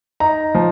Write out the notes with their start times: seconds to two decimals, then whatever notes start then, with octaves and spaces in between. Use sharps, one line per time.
0.20 D#4 A#5
0.55 F3